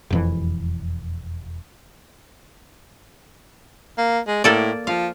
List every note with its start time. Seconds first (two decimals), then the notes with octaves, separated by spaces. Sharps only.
0.10 E1 F2 E3
3.97 A#3
4.27 G#3
4.44 A2 A#3 A4 D5
4.87 F3 F5